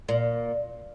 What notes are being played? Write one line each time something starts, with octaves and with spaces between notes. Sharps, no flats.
A#2